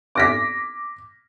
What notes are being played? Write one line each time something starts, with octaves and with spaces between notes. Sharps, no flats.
D6 A#6 B6